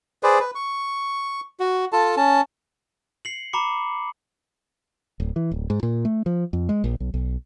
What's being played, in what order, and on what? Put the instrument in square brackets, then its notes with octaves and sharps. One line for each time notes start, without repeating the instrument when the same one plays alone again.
[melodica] G#4 B4 C5 D5
B4
C#6
F#4
F4 A4 A5
C#4 A5
[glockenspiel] C7 C#7 F#7
A#5 B5 D6 C#7
[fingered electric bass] D1
E3
D1
G#2
A#2
A3
F3
F2
G#3
A#1
B1
B1